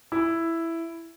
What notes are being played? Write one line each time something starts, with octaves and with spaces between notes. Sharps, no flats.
E4